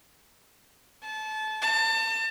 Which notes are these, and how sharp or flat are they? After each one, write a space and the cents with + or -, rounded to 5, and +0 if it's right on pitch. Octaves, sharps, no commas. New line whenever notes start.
A5 -25
A5 +30